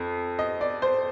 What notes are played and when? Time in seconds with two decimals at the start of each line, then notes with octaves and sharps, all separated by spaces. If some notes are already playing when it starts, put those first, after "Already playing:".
Already playing: F2
0.39 D#5
0.61 D5
0.82 C5